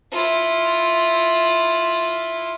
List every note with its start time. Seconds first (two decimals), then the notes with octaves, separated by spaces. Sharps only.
0.12 E4 F4